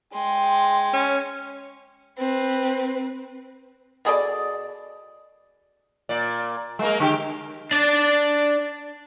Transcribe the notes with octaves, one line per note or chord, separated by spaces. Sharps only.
G#3 G5 C6
C#4
C4 B4
B2 G#4 A4 D5
A#2 D5
G#3 A#3 A#4
D3 G#3 G4
D4 D5